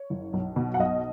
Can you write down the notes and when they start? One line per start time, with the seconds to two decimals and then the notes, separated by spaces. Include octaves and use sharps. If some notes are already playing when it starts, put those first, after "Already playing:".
Already playing: C#5
0.10 F#1
0.33 B1
0.56 B2
0.74 F#5
0.79 B1 D#5